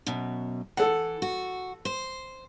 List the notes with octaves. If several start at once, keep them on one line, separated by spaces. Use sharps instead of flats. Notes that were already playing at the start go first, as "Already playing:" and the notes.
F#2 B2
E3 A4 F#5
F#4
C5